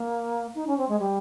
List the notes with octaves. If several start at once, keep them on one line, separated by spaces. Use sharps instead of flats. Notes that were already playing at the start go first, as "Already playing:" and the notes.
Already playing: A#3
D#4
C#4
C4
G#3
G3